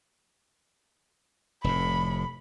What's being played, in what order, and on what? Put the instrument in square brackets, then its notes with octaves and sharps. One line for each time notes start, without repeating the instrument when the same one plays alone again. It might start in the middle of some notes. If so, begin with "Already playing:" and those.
[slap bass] F1 A2 [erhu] B5